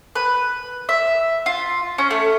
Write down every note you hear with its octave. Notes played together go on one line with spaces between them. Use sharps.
B4
E5
F4
C#4
A3